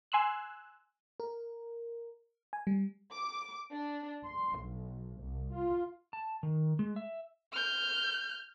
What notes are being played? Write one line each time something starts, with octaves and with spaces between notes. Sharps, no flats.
G#5 C6 E6 F#6
A#4
G#5
G3
D6
D4
C6
B1
C2
F4
A5
D#3
G#3
E5
F6 G6